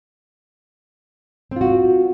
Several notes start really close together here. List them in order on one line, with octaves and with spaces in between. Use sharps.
C4 F4 F#4